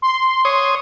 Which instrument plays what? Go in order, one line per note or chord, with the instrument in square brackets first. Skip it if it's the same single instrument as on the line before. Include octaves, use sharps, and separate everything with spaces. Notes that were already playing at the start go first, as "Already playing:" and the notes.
[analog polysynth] C6
[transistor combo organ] C#5 D#6